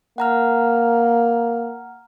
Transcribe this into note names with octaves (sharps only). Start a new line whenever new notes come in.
A#3 F#5 A#5 F6